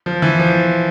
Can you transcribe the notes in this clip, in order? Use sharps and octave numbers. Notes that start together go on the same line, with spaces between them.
F3
E3
F3